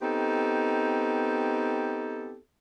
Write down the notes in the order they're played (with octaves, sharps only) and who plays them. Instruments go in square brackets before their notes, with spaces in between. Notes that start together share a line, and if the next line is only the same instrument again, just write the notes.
[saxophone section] B3 C4 D#4 G4 A4